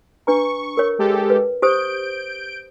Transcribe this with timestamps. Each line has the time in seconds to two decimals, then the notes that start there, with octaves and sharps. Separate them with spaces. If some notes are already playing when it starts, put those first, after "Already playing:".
0.27 D4 B4 A#5 C#6
0.77 A#4 C#5
0.99 G#3 G4 A4
1.30 B4
1.62 G4 C5 D#6 G6 D7